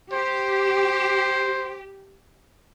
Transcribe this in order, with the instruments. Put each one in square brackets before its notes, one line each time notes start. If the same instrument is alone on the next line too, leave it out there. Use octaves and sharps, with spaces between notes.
[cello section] G4 [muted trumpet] C5